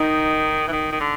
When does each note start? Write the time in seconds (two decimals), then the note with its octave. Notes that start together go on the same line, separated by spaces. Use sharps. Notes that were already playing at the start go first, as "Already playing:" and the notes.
Already playing: D#3 D#4
0.68 E3
0.72 D#3
0.92 D#3
1.00 D3